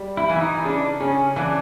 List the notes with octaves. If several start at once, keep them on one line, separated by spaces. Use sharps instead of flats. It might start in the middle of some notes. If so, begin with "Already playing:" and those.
Already playing: G3
E4
E3
E4
D#4
C#3 D4
C#3 C#4
E3 D4